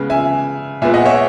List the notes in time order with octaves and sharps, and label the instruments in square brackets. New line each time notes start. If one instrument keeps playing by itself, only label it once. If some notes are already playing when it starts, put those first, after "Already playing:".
Already playing: [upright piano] C#3 G#3 B3
E5 G#5
A#2 G#3 B3 E5 G#5
D#5 F#5
C#5 E5